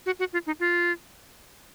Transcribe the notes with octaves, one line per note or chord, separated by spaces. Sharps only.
F#4
F#4
F4
D#4
F4